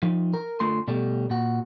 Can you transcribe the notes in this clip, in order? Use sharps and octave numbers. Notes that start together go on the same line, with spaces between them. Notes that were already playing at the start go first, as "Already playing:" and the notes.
F3 D#4
A#4
D3 A3 F4 C6
B2 G3 A3
A#2 F#4